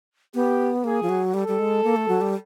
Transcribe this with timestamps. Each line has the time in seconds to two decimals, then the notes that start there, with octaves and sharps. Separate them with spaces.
0.34 B3 G4
0.84 A#3 G#4
1.03 F3
1.09 F#3
1.34 G3 A4
1.48 G3
1.59 G#3
1.84 A#3
1.96 A3
2.08 F#3
2.21 G3